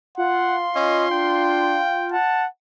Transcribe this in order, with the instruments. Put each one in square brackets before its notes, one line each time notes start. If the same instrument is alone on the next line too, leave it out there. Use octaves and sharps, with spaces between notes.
[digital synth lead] F4 [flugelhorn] F#5 [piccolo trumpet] C6
[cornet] C#4 [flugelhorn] D#5
[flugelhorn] D4 [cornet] G5
[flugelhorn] F#5 [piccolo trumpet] A5